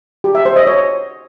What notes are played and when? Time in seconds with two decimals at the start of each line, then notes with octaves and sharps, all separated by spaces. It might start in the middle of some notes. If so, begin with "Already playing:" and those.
0.24 G4
0.35 E5
0.45 C5
0.56 D#5
0.67 C#5